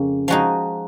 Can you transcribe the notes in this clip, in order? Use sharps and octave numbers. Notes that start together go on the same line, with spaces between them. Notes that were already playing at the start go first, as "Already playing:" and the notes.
Already playing: F2 C#3 A#3 C#4
F3 G#3 D#4 F#4